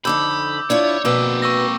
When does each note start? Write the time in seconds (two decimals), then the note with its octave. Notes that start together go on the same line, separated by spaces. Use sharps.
0.05 F2 D3 D#4 B5 D6 E6 G6
0.70 D4 E4 F4 C#5
1.05 B2 A#3 C4 F#4 B4 D6 E6
1.42 C#6 E6 A#6